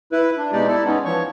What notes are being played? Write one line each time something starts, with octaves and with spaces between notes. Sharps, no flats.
E4 B4
D4
B2 G#3 D#4 G4 D5
E4 A4 D5
G#3 B3 C#4 D#4
E3 F3 C#5 C#6